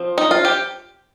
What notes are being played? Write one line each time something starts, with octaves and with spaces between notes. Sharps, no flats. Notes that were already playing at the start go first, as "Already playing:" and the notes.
Already playing: F3 C4
D#4
F4
G4